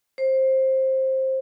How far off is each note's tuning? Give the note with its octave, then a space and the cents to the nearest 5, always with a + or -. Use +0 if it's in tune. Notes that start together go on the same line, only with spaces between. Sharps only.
C5 +15